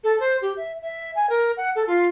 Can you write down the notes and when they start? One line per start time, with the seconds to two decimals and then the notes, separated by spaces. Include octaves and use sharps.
0.04 A4
0.20 C5
0.42 G4
0.57 E5
0.82 E5
1.15 G#5
1.30 A#4
1.57 F#5
1.76 A4
1.87 F4